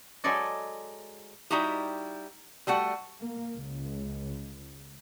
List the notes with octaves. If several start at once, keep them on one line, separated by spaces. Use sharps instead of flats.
F#3 G#3 G#4 A4 D5 D#5
G3 D#4 E4 F#4 G4
G3 A3 F#4 F#5
A#3
C#2